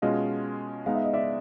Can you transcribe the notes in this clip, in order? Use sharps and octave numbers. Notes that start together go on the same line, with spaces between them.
B2 G#3 C#4 F4 D#5 F5
G#3 B3 D#4 F5
E5
D#5
D5 E5